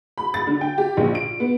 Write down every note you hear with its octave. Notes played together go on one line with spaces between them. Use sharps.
B5
A6
D3
G5
G4
A#1
D7
B3